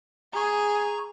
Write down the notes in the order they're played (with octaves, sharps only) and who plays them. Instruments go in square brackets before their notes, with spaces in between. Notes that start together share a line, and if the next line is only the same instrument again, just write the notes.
[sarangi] G#4 [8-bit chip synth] A#5 C#6